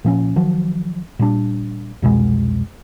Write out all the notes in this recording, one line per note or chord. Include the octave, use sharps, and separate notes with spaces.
A#2 F3 C#4
D#3 F3 F#3
A#2 G3 D4
C2 F2 B2 G#3